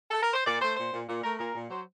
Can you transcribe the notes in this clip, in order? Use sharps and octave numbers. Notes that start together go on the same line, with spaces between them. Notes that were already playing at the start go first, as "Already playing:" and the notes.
A4
A#4
C5
A#2 D5
A3 C5
A#2 C5
A#2
A#2
A3 A#4
A#2 A#4
A#2
F#3 C5